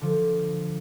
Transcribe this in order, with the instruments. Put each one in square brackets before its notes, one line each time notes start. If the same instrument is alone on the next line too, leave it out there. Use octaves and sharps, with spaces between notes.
[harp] D3 F3